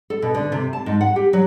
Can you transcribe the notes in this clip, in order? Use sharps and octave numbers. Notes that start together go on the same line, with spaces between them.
A4
B2
D3
C3
A5
G#2
F#5
G4
F#3